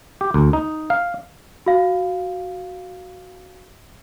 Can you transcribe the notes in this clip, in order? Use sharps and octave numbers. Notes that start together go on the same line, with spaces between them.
G4
D2
D#4
F5
F#4 F5